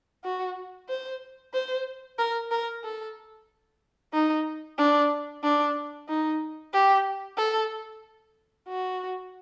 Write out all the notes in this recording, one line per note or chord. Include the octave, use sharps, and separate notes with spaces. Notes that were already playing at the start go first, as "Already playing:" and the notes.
F#4
C5
C5
A#4
A#4
A4
D#4
D4
D4
D#4
G4
A4
F#4